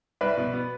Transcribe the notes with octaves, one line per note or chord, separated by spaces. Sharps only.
C2 B4 D5
B2
B3